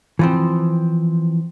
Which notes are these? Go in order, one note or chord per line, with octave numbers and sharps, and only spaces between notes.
E3 F3 C4